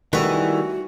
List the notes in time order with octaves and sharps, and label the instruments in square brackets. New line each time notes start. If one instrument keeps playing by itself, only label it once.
[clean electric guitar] D#3 G3 [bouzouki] E3 [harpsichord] A3 B3 C#6 [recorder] F#4